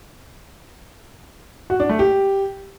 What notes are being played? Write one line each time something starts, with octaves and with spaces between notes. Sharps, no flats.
F#4
D4
A3
G4